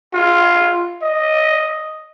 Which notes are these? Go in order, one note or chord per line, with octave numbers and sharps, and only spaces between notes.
F4
D#5